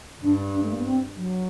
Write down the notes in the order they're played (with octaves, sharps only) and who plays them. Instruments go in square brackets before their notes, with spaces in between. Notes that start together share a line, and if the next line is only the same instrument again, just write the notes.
[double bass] G2 [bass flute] D4
[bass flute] D4
A3
A#3
B3
C4
F#3